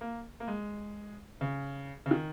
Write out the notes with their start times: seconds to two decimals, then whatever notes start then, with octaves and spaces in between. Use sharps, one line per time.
0.01 A#3
0.40 A#3
0.48 G#3
1.41 C#3
2.06 C#3
2.11 D#3